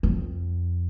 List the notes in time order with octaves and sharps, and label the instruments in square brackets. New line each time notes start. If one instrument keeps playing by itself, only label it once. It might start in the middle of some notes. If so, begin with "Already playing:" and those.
[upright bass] F2